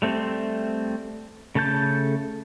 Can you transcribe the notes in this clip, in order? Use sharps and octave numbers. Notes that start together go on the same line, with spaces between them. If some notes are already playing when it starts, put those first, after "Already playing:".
G3 A3 C4
C#3 A3 A4 A5 G6